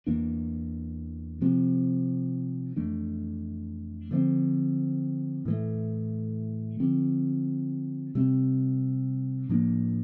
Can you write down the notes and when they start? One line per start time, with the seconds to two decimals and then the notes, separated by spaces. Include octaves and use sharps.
0.07 E2 E3 A#3 D4
1.41 C3 F3 C4
2.76 F2 E3 A3 D4
4.11 D3 F3 A3 C4
5.45 A2 E3 A3
6.80 D3 F3 C4
8.15 C3 G3 C4
9.49 A2 F3 A#3 D4